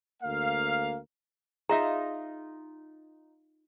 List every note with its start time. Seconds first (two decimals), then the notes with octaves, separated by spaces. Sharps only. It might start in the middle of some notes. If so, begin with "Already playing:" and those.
0.23 D2 A#3 F5
1.69 D#4 F4 G#4 D#5 E5 A#5